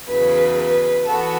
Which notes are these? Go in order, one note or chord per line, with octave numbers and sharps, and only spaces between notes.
E2 C#3 F#3 B4
B4
E3 B3 F#4 A4